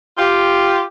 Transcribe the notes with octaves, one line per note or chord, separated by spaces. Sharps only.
F4 G4